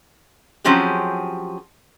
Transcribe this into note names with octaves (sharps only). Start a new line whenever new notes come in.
F3 F#3 C4 C#4 G4 G#4